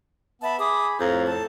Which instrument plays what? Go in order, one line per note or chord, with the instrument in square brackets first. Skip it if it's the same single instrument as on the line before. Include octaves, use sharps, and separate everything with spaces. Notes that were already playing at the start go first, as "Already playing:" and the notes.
[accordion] B3 [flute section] E5 A5 B5
[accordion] G#4 B5 [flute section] D6 D#6
[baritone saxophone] F2 [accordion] A2 [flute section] F5 A#5
[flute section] A4 A5